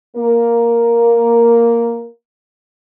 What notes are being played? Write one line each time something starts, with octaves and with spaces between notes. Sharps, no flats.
A#3 A#4